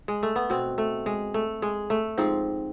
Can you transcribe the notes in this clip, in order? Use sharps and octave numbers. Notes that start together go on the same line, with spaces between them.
G#3
A3
B3
B2 C4
A3
G#3
A3
G#3
A3
G#2 F3 C4